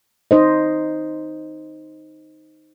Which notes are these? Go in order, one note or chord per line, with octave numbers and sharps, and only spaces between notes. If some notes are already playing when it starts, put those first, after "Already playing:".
D#4 C5 D#5